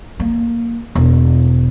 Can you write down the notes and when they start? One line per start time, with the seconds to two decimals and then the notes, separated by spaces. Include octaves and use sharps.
0.20 A#3
0.95 E1